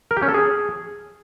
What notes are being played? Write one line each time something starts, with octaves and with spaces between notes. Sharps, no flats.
A#4
G4
C#4
A4
G#4